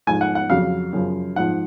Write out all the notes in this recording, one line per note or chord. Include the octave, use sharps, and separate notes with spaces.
G#2 F3 G#5
F#5
F#5
F2 C#3 F#3 F5
F#2 C#3 F3
G#2 F3 F#5